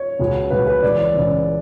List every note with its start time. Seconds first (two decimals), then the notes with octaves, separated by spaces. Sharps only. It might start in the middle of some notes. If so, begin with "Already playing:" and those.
Already playing: C#5
0.19 C#2 C#3 F#3
0.50 C#2 C#3 F#3 B4
0.67 B4
0.83 C#2 C#3 E3 D5
0.99 C#5
1.14 C#2 C#3 E3